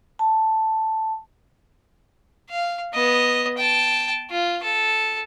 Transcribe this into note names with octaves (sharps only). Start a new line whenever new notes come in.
A5
F5
B3 D#5
G5 A5
F4
A4